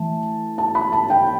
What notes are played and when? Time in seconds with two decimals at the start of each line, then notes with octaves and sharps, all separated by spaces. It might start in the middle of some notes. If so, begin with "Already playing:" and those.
Already playing: E3 A3 A5
0.58 A5
0.75 B5
0.92 A5
1.10 G5